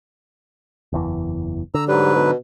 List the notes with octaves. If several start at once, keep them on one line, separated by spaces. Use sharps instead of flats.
F#1 E2 E3
D3 A#5 E6
G#2 F#3 G3 B4
B2